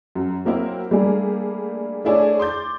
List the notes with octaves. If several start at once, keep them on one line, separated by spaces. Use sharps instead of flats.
F#2
F#3 A#3 C4 E4
G3 A3 A#3 D4 G#4
A3 D4 E4 G#4 C#5 D5
C6 D6 G6 A6